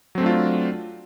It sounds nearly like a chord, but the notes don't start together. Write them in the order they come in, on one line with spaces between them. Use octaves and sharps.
F#3 C4 A3 D4 F4